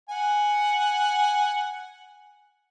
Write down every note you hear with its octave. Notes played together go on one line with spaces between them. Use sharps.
F#5 G#5